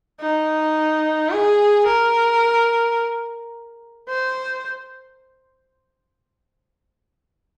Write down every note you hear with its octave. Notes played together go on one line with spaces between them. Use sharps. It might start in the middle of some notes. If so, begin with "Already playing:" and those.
D#4
G#4
A#4
C5